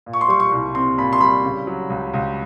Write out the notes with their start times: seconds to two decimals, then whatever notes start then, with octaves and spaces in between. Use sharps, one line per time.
0.06 A#2
0.13 C#6
0.21 C6
0.28 G3 C#6
0.40 C#6
0.52 C2
0.75 C4 C6
0.98 A#2 B5
1.13 C6
1.21 G3 B5
1.44 C#3
1.67 F#3
1.90 C#2
2.13 C#2